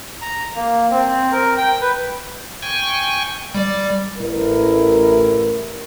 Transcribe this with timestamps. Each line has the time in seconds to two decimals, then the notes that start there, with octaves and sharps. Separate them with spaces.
0.21 A#5
0.56 A#3
0.91 C4
1.32 A#4
1.58 G5
1.81 B4
2.62 G5 G#5 C#6
3.55 G3 D5 D6
4.19 A1 E4 A#4